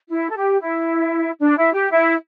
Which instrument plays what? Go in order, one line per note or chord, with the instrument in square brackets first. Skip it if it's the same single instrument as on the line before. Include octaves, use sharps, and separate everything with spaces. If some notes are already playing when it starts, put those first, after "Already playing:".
[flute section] E4
A4
G4
E4
D4
E4
G4
E4